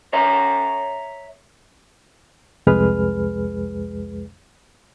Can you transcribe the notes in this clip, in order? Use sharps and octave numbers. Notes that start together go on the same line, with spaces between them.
C#5 E5 A#5
C2 F2 G#3 G#4 B4 F6